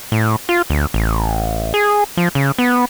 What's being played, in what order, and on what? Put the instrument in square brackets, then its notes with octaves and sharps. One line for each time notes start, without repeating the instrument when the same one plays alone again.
[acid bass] A2
F4
D2
A1
G#4
F3
C#3
B3